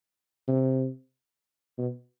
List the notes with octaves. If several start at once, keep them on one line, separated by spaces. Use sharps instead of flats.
C3
B2